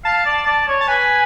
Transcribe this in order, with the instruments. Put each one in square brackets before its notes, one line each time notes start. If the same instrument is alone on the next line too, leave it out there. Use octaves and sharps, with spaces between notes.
[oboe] F5 [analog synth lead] A5
[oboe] D5
D5
C#5
[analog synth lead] A5
[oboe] B4 [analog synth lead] G#5